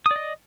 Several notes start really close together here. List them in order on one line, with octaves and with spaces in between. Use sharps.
D#6 D5 D#5